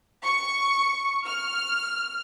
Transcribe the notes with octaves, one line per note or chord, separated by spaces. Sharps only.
C#6
F6